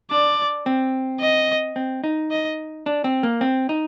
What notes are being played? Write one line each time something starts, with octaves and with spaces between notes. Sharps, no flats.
D4 D5
C4
D#5
C4
D#4
D#5
D4
C4
A#3
C4
D#4